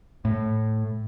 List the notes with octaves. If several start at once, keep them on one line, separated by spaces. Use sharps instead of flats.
A2